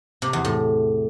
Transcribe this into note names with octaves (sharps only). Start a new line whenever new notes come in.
C3
E2
A2